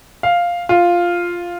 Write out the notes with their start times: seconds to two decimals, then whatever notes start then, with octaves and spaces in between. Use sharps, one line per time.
0.23 F5
0.69 F4